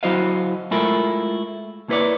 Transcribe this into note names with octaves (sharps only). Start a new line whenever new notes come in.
F#3 E4 F#4 C5 D#5 F5
G#3 A3 E4 F4 A#4
A#3 E4 B4 C#5 D5